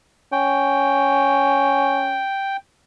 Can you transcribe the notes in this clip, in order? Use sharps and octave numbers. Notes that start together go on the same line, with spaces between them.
C#4 G5